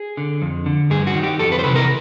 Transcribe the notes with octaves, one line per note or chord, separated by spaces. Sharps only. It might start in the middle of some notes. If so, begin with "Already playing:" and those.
Already playing: G#4
D3
F2
D3
G2 G#4
F#4
D#3
G4
F2 A4
B4
C5
C3 E3 B4
A#4